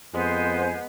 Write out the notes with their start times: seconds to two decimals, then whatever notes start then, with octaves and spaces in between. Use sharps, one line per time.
0.14 F2 G#3 B3 C5 G#5